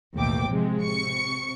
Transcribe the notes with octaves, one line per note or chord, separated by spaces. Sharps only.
A1 D#2 B2 A3 G5 D6
C3 F3 G#3
C3 C#6 C#7